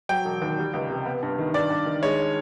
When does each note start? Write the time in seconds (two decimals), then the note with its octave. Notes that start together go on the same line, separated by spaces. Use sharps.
0.09 F#3 G5
0.25 E1
0.42 D#2
0.58 G3
0.74 C#2
0.90 C3
1.06 B3
1.23 G2
1.38 D#3
1.54 G2 D5
1.70 G2
1.86 D#3
2.03 G#3 C#5